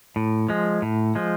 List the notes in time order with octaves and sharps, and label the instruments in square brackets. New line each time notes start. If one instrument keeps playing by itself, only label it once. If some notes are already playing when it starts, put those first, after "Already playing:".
[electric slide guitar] A2
F3 G#3
A2
F3 G#3